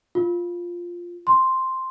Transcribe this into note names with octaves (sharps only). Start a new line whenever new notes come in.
F4
C6